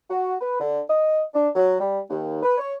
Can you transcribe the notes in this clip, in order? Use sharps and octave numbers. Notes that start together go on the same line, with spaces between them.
F#4
B4
D3
D#5
D4
F#3
G3
D#2
B4
C#5